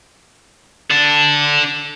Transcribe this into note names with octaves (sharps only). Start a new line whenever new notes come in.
D4 A4